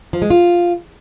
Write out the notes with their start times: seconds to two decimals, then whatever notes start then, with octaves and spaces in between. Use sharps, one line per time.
0.13 F3
0.22 G#3
0.30 F4